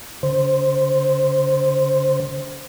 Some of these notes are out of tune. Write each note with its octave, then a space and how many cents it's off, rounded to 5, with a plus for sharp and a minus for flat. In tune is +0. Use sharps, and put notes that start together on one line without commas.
D3 -45 C5 +5